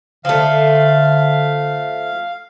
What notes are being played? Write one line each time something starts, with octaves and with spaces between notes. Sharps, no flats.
D3 F3 A3 F5